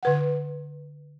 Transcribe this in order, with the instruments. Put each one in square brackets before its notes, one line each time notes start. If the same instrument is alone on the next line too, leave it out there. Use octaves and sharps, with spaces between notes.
[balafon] D3 B4 F#5